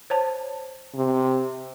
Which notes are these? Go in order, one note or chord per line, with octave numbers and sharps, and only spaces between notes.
C5 C#5 A5
C3